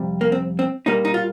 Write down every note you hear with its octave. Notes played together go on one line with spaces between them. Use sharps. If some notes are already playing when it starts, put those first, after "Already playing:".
Already playing: F2 C3 G3
A#3
C4
C4
A#2 G3 A#3 D#4
D#4
F4